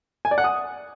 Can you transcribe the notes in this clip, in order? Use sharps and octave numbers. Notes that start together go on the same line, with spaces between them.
G#5
D5
F#5
D#6